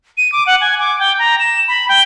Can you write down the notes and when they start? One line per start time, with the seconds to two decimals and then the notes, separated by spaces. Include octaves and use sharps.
0.17 D#7
0.32 D6
0.47 F#5
0.61 G#5
0.80 D6
0.99 G5
1.19 A#5
1.40 E7
1.68 B5
1.88 G5